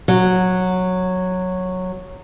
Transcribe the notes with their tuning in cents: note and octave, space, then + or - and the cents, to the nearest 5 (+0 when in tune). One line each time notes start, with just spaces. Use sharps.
F#3 -10